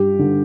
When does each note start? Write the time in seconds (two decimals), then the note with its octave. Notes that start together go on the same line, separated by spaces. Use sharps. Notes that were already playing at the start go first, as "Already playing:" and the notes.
Already playing: G2 G4
0.19 D3